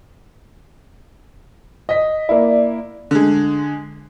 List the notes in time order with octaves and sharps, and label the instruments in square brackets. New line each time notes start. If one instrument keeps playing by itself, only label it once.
[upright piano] D#5 B6
[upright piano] A#3 E4 [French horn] D5
[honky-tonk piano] D3 G#3